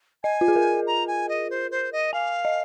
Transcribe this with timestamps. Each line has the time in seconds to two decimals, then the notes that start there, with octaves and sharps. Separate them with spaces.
0.23 D#5 G#5
0.41 F4
0.48 G#4
0.56 A#4
0.87 A#5
1.07 G#5
1.29 D#5
1.50 C5
1.71 C5
1.92 D#5
2.13 F5 G#5
2.45 D#5